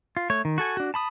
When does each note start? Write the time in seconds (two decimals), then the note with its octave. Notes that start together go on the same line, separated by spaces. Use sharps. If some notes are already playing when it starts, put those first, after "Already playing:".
0.17 F4
0.30 A3 C#5
0.45 D#3
0.58 F#4 A4 G#5
0.77 D4 F#4
0.94 A5 B5 D#6